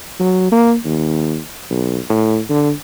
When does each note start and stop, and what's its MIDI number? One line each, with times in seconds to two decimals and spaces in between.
0.19 0.47 54
0.52 0.75 58
0.85 1.37 39
1.70 1.98 35
2.10 2.40 45
2.50 2.70 50